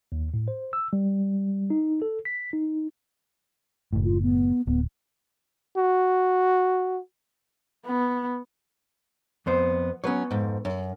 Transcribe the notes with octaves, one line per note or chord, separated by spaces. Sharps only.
D#2
A2
C5
E6
G3
D#4
A4
B6
D#4
F#1 A2
F4
B3
D1 B3
F#4
B3
F2 B3 C5
F#3 B3 C#4 B4 C#5
F2 G#2
F#2